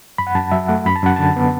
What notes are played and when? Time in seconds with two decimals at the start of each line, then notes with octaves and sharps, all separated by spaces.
0.18 F#2 B5
0.27 F#5
0.35 F#2 A5
0.52 F#3 E5
0.68 A3 F#5
0.86 F#2 B5
0.96 A5
1.03 F#2 F#5
1.16 D3 A5
1.36 B3